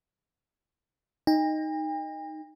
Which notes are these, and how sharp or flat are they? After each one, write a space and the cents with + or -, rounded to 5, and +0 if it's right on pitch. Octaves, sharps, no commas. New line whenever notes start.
D#4 +0 G5 +45